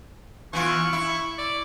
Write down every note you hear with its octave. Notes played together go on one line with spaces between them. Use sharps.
E3 B3 F4 C#6
E4
D5